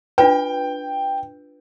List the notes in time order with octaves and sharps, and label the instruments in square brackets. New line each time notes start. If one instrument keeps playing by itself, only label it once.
[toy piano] D4 F4 B4 [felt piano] G5